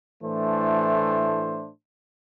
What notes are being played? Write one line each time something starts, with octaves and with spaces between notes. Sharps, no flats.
A2 E3 A3 D4 C5